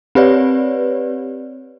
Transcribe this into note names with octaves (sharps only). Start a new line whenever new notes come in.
C4 G4 B4 C#5 D5